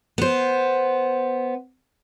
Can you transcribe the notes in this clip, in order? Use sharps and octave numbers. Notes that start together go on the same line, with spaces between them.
B3 C5